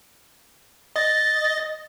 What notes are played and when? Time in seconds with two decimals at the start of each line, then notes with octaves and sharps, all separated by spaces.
0.96 D#5 A6